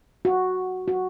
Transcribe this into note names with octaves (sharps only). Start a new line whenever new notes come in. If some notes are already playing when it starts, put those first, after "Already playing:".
F#4
F#4